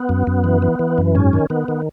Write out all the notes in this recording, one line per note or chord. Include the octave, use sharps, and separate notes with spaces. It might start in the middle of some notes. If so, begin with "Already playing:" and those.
Already playing: B3
F#2
F#2
E3
E3
E3
F#2
G#2 C#4
D#3
D#3 B3
D#3